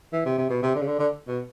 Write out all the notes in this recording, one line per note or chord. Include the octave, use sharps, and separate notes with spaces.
E3
C3
C3
B2
C3
D3
C#3
D3
D3
B2